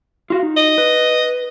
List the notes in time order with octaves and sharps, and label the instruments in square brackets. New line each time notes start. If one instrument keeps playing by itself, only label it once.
[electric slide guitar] F4 F#4 F5
D#4
[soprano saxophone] D#5
[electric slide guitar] B4